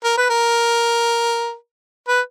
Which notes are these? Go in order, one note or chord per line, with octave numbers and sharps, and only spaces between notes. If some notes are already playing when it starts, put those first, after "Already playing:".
A#4
B4
A#4
B4